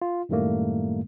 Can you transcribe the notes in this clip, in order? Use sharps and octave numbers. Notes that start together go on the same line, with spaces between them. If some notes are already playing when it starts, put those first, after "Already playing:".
F4
F#2 A2 D#3 G3 A3 A#3